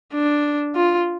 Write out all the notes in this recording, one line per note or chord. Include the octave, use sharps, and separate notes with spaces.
D4
F4